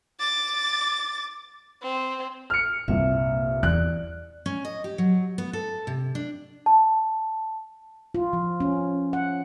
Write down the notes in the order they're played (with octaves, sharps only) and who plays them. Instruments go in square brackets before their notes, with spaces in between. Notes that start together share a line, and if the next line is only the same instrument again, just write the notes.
[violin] D6 A6
C4
[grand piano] F6 C#7
[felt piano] C2 G2 A#2 [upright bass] A#3 [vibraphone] E5
[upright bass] E2 [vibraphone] D5 [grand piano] F#6
[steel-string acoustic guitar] C#4
D#5
G4
F#3
B3
A4
C3
D4
[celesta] A5
[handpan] F4
F3
C#4
F#5